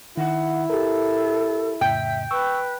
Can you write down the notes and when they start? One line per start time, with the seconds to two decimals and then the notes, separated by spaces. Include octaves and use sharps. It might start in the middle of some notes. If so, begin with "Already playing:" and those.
0.17 D#3 E4 F#5
0.70 G4 A4 A#4
1.81 F2 A2 C#3 E5 G5
2.31 B4 C#6 E6